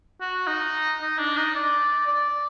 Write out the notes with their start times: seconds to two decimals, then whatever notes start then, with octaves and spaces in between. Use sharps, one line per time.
0.21 F#4
0.47 D#4
1.02 D#4
1.19 D4
1.37 D#4
1.55 D5
2.07 D5